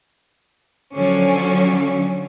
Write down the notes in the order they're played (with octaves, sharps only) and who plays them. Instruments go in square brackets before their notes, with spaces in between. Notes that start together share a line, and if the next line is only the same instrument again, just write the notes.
[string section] D3 F3 F#3 C#4